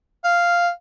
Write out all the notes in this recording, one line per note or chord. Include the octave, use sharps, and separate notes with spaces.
F5